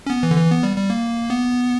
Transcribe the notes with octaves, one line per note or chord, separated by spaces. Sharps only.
C#4
B3
E3
D3
E3
B3
G3
G3
A#3
B3